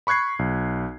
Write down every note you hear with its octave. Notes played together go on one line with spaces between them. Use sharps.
B5 C#6 F#6 G#6 C7
B1